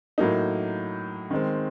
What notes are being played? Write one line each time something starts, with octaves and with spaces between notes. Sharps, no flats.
A2 F#3 A#3 D#4
D#3 G#3 C4